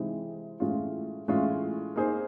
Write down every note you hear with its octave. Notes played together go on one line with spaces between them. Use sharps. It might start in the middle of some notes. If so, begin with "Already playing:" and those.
Already playing: C3 E3 G#3 C4 D#4
A2 E3 G#3 C#4 F4
A2 E3 G#3 C#4 F4
A#3 D#4 G#4 C5